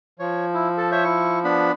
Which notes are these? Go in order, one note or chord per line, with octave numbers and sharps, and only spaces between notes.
F3 C#5
E4
A4
C5 C#5 E5
E4 C#6
B3 D4 B5